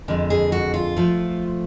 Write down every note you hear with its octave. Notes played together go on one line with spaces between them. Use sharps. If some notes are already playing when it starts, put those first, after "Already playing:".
F2 D3 G#3
G#4
F#4
F4
F3 A3